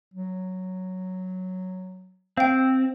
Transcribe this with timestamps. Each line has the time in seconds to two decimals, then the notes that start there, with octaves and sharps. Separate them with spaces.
0.14 F#3
2.37 C4 F5 G5